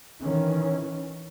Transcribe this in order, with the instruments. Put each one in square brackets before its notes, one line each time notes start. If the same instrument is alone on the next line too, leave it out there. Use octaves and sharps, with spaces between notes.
[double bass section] D#3 E3 C#4